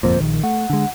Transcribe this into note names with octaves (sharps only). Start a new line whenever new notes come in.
G1 F2 A#2 C5
A#1 D#3
A3 F#5
D3 G#3